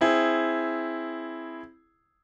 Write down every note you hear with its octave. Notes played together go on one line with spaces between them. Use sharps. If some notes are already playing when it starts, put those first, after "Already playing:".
C4 E4 G#4